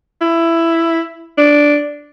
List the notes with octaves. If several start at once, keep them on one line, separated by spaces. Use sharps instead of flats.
E4
D4